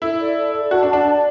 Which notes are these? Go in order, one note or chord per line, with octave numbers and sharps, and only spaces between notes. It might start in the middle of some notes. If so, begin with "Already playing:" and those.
E4 A4
D5
A4
D5
F#4 A5
D4
A5
D4
D5